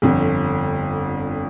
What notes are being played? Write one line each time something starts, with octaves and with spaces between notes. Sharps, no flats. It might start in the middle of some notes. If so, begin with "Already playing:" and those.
G1 F2 D3